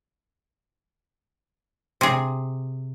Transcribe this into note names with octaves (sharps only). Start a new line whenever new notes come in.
C3 G#4